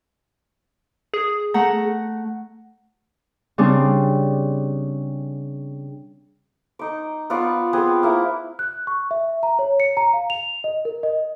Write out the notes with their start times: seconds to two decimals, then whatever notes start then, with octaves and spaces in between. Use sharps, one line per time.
1.14 G#4
1.54 A3 F#5 A#5
3.58 C#3 G3 C4 D4
6.79 D#4 D6
7.30 B3 F4 D5 C#6
7.73 B3 C4 G#4
8.03 A#3 E4
8.59 F#6
8.87 C#6
9.11 E5
9.43 A#5
9.59 C#5
9.80 C#7
9.97 A#5
10.13 F5
10.30 F7
10.64 D#5
10.85 A#4
11.03 D#5